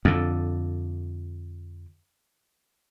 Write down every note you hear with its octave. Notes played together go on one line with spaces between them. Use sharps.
F2 D3